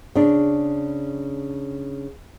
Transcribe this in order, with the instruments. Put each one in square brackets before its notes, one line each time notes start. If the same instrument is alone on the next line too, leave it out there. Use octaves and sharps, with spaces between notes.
[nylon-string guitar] C#3 D4